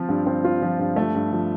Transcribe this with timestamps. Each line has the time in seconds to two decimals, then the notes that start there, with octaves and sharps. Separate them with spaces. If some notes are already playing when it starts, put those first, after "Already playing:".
Already playing: F3 C4 F4
0.09 G2
0.26 C4
0.44 F4
0.62 F3
0.79 G2
0.96 A3
1.15 G2
1.32 F3